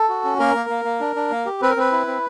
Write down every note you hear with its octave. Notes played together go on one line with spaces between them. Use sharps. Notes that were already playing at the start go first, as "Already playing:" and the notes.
Already playing: A4
F#4
C#4
A#3 A#4
A#3
A#3
A#3
D4
D4
A#3
G4
C4 B4
A#4
C4 B4
E4
C4